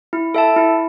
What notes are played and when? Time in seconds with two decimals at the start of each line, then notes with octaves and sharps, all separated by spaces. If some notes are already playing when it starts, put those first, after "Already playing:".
0.13 E4
0.34 A4 E5 A5
0.56 E4